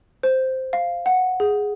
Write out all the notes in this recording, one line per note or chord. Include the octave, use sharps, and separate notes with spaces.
C5
F5
F#5
G#4